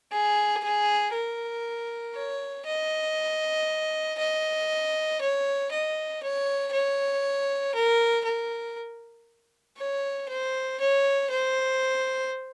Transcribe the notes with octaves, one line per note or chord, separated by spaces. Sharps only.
G#4
G#4
A#4
C#5
D#5
D#5
C#5
D#5
C#5
C#5
A#4
A#4
C#5
C5
C#5
C5